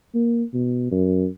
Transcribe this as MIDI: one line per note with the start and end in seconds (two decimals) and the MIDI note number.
0.15 0.43 58
0.54 0.87 47
0.91 1.28 42